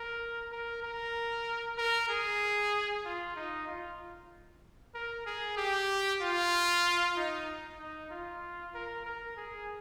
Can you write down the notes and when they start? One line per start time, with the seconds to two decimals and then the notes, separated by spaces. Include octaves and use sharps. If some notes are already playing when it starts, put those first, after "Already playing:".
Already playing: A#4
0.52 A#4
0.83 A#4
1.78 A#4
2.09 G#4
3.05 F4
3.36 D#4
3.67 F4
4.95 A#4
5.26 G#4
5.57 G4
6.21 F4
7.16 D#4
7.79 D#4
8.10 F4
8.74 A#4
9.06 A#4
9.37 G#4